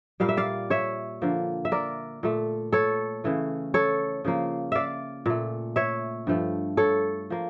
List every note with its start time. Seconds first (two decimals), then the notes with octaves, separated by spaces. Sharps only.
0.20 A#2 G3 A#3 F5
0.29 E5
0.37 D5 F5
0.70 C#5 E5
1.22 D3 F3 A#3
1.65 E5
1.72 A#4 D5
2.23 A#2 A3
2.72 A4 C#5
3.24 C#3 E3 A3
3.74 A4 C#5
4.25 C#3 F3 A#3
4.72 D5 E5 F5
5.26 A#2 A3
5.76 C#5 E5
6.27 G2 F3 A3
6.77 A4 C#5
7.30 F3 A#3